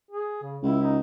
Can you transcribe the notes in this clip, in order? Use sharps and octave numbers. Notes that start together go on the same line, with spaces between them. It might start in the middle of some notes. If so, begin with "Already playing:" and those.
G#4
C#3
C#2 E4
D#4